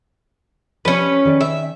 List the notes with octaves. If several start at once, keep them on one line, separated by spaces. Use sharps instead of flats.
F3 G3 C#4 B4
D#3 G#4 D5
E5